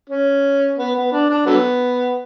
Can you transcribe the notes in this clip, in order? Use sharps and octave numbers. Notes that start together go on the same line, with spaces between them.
C#4
B3
B3
D4
D4
D3 F#3 B3